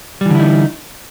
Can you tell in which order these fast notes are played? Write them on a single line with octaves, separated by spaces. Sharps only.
G3 E3 D3 E4 D#4